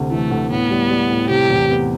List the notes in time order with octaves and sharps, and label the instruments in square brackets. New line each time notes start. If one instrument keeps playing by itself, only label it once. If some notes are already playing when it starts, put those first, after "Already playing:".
Already playing: [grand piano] D2 C3
[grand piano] E3 [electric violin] A3
[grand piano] D2
[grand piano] A2 [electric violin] B3
[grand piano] G3
G3
A2
[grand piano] C3 [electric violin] G4
[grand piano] E2
B3